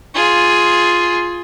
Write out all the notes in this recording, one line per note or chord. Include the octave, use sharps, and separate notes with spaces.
F4 G#4